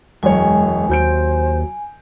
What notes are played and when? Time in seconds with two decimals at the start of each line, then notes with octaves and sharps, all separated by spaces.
0.23 E1 F#2 G#3 C#5 G#5
0.89 D#2 F#3 C5 G6 D7